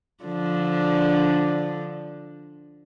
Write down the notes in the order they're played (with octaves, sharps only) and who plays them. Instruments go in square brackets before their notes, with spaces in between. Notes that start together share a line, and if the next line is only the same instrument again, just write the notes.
[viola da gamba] D3 F3 D4